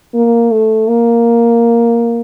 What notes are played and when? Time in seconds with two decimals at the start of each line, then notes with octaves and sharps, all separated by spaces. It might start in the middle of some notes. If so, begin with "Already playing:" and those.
0.14 A#3
0.51 A3
0.87 A#3